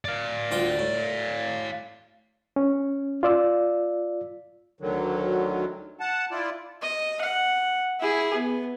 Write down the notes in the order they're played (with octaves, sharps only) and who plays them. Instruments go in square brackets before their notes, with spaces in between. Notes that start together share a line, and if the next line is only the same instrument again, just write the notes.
[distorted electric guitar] D5 F5
[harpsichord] D2 F4 G5
A2
[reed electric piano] C#4
F4 D5 E6
[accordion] D2 D3 D#3 F#3
F#5 A5
E4 F4 D5
[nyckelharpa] D#5
F#5
E4 G#4
B3